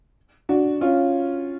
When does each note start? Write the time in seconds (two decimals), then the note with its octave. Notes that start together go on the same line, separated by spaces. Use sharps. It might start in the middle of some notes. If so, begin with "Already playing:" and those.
0.49 D4 F#4
0.81 C#4 F4